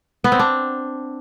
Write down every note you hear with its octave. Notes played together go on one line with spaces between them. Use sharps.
B3
C4
D4